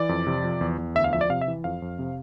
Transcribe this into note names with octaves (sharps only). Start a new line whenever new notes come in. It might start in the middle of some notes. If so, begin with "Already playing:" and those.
Already playing: E3 D5
F2
C3
F3
E2
E2
D2 E5
F5
F3 E5
D5
C3 F5
E5
E3
F2 F5
F2
C3